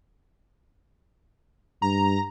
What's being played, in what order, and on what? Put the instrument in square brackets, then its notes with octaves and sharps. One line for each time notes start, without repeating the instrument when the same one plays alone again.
[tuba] G2 [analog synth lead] A#5